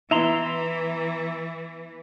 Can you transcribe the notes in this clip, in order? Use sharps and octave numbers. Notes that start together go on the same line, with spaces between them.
E3 B3 E4 E5 A#5 C6